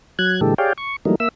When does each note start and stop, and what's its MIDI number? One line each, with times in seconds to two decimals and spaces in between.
0.19 0.40 54
0.19 0.40 90
0.19 0.40 92
0.41 0.54 46
0.41 0.54 50
0.41 0.54 52
0.41 0.54 56
0.41 0.54 67
0.41 0.54 69
0.58 0.73 67
0.58 0.73 68
0.58 0.73 73
0.58 0.73 74
0.58 0.73 77
0.58 0.73 79
0.78 0.96 85
1.05 1.15 52
1.05 1.15 54
1.05 1.15 55
1.05 1.15 57
1.05 1.15 58
1.05 1.15 63
1.20 1.28 58
1.20 1.28 76
1.20 1.28 88